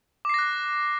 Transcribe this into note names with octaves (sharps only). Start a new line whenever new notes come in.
D6 F#6 A#6 C7